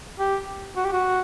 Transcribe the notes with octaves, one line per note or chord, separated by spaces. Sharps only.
G4
F#4
G4
F#4